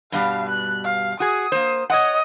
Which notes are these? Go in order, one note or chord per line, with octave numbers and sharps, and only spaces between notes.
G2 B2 G3 F5
F#6
F5
F#4 G#4 D#6
A#3 C5
C#5 D#5 F#5